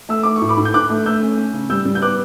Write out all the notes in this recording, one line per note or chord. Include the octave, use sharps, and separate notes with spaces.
A3 E6
A3 D6
C#6
A2
B5 D6
A2
G6
D3 D6 F#6
A3
A3 E6 G6
C#4
C#4
C#3
G3 E6 G6
G3
G6
B3 D6 F#6